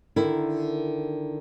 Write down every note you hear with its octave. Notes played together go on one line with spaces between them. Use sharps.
D3 D#3 E4 A#4